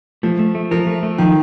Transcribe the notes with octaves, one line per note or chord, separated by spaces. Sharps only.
F3 A3
A3
A3
F3 A#4
A3
A3
D#3 F3